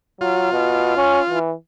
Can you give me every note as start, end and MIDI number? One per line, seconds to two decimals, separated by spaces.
0.21 0.50 54
0.21 1.39 65
0.53 0.95 47
0.97 1.20 61
1.29 1.54 52